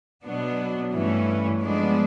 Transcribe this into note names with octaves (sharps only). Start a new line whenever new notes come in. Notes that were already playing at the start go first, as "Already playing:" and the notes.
B2 F#3 B3 D4
G2 E3 A3 C#4
F3 G#3 B3 D4